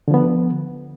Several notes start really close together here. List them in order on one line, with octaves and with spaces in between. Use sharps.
D3 F3 B3